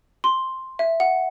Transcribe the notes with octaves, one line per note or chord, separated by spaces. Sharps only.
C6
E5
F#5